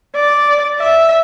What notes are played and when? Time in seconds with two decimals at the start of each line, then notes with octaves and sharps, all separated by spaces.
0.16 D5
0.80 E5